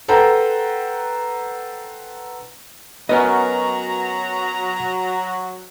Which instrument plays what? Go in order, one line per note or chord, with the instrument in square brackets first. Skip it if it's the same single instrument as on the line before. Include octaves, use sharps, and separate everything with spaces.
[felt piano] A4 B4 C5 F#5 G5 A#5
[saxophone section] F#3 F#4 [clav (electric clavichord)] B3 C#4 A#4 [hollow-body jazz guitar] B4 D#5 [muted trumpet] A#5